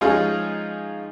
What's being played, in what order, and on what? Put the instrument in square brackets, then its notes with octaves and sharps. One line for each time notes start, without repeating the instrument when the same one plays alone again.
[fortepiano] F3 G#3 C#4 D#4 F4 G#4